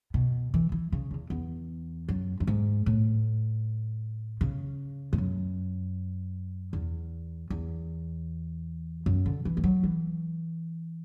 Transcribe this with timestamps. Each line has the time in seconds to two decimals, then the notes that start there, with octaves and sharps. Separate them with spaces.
0.14 B2
0.54 E3
0.72 E3
0.92 C#3
1.11 E2
1.30 E2
2.08 F#2
2.40 F#2
2.47 G#2
2.86 A2
4.41 C#3
5.13 G#2
5.18 F#2
6.73 E2
7.50 E2
9.06 F#2
9.26 D3
9.45 E3
9.57 G#3
9.64 F#3
9.83 E3